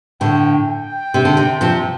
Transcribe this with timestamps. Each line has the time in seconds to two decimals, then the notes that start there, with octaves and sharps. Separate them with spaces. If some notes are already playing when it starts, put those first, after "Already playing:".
0.21 A2 D3 G5
0.68 G5
1.14 C3
1.25 D3
1.37 C3
1.61 C3 F3